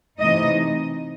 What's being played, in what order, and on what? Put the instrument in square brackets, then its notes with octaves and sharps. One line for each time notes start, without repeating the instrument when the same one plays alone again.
[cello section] C3 E3 A3 D#4 D#5